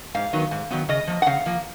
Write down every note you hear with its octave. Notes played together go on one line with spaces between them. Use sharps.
G#2 F5
D#3 F#3 B3
G#2
D#3 F#3 B3
C#3 D#5
F3 A#3
F#5
C#3 F5
F3 A#3